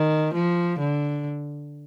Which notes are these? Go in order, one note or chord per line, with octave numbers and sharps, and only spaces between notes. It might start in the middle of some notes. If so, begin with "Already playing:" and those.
Already playing: D#3
F3
D3